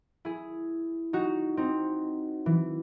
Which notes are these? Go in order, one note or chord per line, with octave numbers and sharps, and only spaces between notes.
E4 G#4
D#4 F#4
C4 D#4
E3